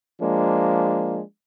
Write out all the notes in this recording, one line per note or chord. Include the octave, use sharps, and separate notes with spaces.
F3 G#3 A#3 D4